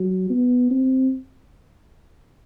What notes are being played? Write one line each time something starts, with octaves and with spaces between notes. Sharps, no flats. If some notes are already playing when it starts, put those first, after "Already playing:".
Already playing: F#3
B3
C4